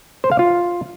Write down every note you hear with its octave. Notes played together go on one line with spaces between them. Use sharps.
C5
F5
F4